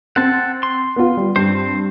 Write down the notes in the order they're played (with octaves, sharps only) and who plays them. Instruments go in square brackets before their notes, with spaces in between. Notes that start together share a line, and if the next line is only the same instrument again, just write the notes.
[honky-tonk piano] C4 [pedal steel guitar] F#5 A5
[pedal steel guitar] C6
[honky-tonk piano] B3 F4
G3
[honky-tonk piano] G2 [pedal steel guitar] C4 C5